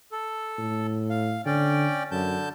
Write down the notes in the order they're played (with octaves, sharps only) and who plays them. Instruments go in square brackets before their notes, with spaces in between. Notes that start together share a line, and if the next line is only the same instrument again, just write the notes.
[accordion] A4
[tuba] A2
[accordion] F5
[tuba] D3 [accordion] C#4 D5 G5
[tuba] F#2 [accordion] D3 A5 G6